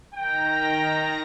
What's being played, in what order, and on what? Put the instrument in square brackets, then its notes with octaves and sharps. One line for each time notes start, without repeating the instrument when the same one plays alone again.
[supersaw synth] D#3 A#5 A#6 [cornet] G5